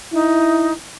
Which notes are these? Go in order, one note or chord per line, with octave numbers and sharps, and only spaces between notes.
D#4 E4